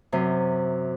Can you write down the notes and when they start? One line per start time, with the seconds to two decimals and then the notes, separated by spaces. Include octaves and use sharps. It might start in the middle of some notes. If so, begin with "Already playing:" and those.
0.12 F#2 C3